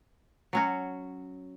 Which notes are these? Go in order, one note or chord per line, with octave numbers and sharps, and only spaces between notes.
F#3 C#4 F#4